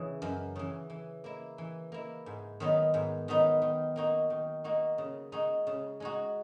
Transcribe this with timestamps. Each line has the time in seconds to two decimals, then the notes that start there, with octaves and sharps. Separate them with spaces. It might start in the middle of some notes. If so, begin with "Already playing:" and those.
Already playing: C#3 E3
0.22 F#2
0.56 C#3 E3
0.90 E3
1.24 A#3 E4
1.58 E3
1.92 A#3 E4
2.26 G#2
2.60 D#3 F#3 B3 D#4
2.94 G#2
3.28 D#3 F#3 B3 D#4
3.62 D#3
3.96 A#3 D#4 F#4
4.30 D#3
4.64 A#3 D#4 F#4
4.98 C#3
5.32 G#3 D#4 F#4
5.67 C#3
6.00 G#3 D#4 F#4